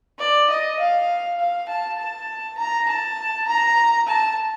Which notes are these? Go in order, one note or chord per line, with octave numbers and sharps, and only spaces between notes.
D5
D#5
F5
F5
A5
A5
A#5
A5
A#5
A5